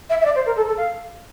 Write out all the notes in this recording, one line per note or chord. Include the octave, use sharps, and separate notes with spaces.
E5
E5
D5
C5
A#4
A4
A4
F5